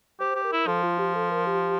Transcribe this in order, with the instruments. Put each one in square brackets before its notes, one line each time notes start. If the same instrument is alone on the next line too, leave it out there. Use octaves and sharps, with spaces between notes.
[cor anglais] G4 [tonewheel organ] C5
[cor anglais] G4
[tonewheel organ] A#4
[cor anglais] E4
[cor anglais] F3 [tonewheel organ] A4
[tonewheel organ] F4
G4
A4
A#4
G4